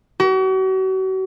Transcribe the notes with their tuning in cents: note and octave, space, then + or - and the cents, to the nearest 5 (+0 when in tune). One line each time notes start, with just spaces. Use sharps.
F#4 +40